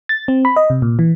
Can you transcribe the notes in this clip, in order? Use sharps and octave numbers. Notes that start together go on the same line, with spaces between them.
A6
C4
B5
D#5
C3
A#2
E3